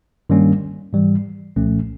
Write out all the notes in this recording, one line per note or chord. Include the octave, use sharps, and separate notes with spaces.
G2 D#3 G3 A#3 C#4
G#2 E3 G3
C2 A#2 F3 A3 C#4